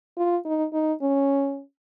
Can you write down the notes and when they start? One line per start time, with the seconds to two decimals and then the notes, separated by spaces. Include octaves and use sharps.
0.17 F4
0.45 D#4
0.73 D#4
1.02 C#4